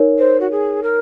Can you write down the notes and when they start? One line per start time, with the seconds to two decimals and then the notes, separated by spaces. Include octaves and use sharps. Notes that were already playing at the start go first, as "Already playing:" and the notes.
Already playing: D#4 A#4 C#5
0.18 C5
0.40 F#4
0.51 G#4
0.83 A#4